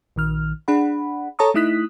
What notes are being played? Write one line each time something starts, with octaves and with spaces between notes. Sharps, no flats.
A#1 D#3 F6
D4 G#4 F#5 B5
A4 C#5 A5 A#5 C#6 D#6
A3 D#4 E4 D#6 F#6 B6